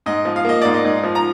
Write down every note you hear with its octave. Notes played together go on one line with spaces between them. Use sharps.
G#2 D#5
F3
F5
A#3 D#5
G#2 D5
D#5
G#2
F3
A#5